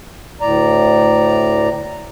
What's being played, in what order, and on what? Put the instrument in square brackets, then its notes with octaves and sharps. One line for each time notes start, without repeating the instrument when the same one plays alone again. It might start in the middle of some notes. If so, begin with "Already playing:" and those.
[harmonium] D2 A2 D5 A#5